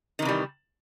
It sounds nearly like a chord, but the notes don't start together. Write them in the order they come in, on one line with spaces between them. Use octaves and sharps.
D#3 C3 E3 G3